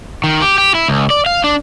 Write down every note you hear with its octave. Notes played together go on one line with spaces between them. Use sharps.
D#3
G4
G4
E4
C#2
D5
F5
D4